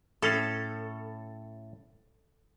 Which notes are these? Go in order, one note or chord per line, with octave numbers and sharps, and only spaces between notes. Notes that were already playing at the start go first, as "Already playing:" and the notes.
A2 C#4 A4 F5